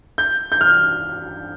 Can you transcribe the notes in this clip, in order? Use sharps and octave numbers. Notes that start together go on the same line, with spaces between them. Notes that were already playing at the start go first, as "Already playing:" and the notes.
G6
G6
F6